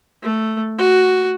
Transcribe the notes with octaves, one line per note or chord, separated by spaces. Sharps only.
A3
F#4